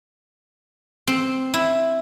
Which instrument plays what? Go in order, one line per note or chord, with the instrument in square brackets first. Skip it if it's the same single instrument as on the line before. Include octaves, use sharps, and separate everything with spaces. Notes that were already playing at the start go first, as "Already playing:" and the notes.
[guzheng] C4
E4